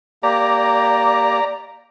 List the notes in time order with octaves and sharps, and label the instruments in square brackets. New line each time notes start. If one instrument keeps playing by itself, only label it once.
[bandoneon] A#3 G4 [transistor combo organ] D5 A#5